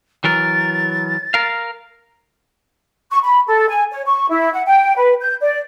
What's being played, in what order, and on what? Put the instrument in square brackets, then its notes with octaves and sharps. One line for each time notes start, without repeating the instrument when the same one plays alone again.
[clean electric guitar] E3 F#3 A#4 [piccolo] A6
[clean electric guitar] A#4 F5
[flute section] C#6
B5
A4
G#5
C#5
C#6
E4
F#5
G5
B4
G6
D5